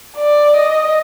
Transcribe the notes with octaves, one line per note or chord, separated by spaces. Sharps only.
D5
D#5